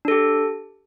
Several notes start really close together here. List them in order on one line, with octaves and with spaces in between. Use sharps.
D4 A4 G4